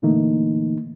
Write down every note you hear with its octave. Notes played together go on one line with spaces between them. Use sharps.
A#2 D3 E3 A3 A#3 D#4